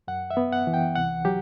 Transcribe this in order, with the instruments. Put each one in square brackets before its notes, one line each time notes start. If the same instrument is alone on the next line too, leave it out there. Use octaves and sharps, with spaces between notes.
[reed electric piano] F#2 F#5
E5
B3
F#5
E3
G5
C2 F#5
F#3 G4